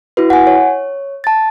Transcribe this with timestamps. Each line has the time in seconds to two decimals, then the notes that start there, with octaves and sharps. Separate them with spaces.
0.17 E4 F#4 B4
0.30 F#5 G#5
0.47 C#5
1.24 A5 A6